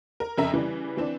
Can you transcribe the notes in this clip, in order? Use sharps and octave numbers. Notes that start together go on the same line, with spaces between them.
A#4
F2 C#3 A#4 E5 A#5
C#3 E3 G3
E3 C4 D4